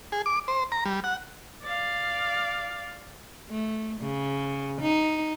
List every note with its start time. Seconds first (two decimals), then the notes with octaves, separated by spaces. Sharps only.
0.12 G#4
0.26 D6
0.48 C5
0.72 A#5
0.86 G3
1.04 F#5
1.63 D5 F5
3.50 A3
4.01 C#3
4.81 D#4